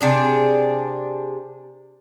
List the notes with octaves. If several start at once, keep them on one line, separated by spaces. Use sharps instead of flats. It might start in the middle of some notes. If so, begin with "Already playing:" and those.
C3 D4 G#4